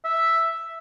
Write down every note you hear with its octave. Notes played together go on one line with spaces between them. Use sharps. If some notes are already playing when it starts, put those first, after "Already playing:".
E5